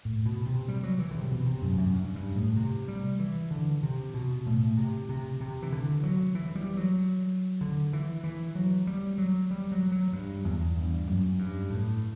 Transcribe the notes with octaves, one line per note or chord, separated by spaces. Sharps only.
A2
B2
C3
G3
F#3
E3
D3
C3
B2
C3
F#2
F#2
G2
G2
A2
C3
G3
E3
D3
C3
B2
A2
C3
C3
C3
E3
D3
F#3
E3
G3
F#3
D3
E3
E3
F#3
G3
F#3
G3
F#3
F#3
G2
E2
G2
F#2
G2
A2